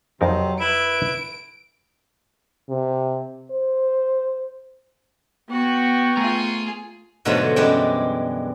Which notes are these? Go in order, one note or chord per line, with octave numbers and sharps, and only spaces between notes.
F2 C3 F#3 D#4 A#4
E4 B4 D7
C3
C5
B3 F#4 G5 C#6
A3 F4 G#4 A#5
G#2 B2 D3 F3 F#3 A3
F#2 E3 G3 G#3 D4 G5